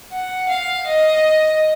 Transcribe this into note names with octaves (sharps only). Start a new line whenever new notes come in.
F#5
F5
D#5